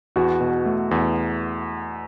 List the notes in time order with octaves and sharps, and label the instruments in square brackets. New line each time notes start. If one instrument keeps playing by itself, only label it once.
[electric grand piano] E2 [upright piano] F#4
[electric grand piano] B2
A3
E2